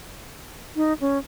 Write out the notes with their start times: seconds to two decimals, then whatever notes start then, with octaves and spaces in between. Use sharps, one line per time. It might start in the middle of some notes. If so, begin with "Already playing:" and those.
0.76 D#4
1.01 C#4